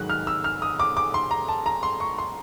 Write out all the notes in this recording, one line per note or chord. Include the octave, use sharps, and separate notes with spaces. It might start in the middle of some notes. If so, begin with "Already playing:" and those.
Already playing: G#2 D#3 F#3 F#6
F6
E6
F6
D#6
D6
D6
C6
A#5
A5
A#5
C6
C#6
C6